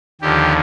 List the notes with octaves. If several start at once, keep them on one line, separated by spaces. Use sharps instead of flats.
D#2 D3 F3 G4